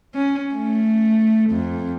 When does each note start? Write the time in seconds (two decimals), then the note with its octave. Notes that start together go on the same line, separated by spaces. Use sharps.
0.14 C#4
0.54 A3
1.50 F2